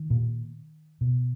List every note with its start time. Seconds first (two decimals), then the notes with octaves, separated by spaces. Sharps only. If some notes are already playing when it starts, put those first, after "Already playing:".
Already playing: D#3
0.10 A#2
1.01 B2